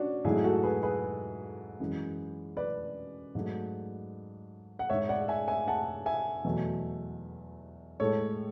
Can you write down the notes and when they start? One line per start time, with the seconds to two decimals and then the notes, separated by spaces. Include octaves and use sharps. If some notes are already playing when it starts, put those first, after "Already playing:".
Already playing: C#4 D4 F#4
0.24 G#2 F#3 A3 E4 G#4
0.44 F#4 A4
0.63 G#4 B4
0.83 G#4 B4
1.80 F#2 E3 G#3
2.57 B4 D5
3.35 G#2 F#3 A3
4.79 F#5
4.89 G#2 G#3 C#5 E5
5.09 D5 F#5
5.28 E5 G#5
5.48 E5 G#5
5.68 F#5 A5
6.06 E5 G#5
6.44 E2 B2 F#3 A3
8.00 A2 G#3 A4 C#5